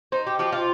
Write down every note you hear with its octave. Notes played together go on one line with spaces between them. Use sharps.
D#4 C5
G4
F3 G4
F4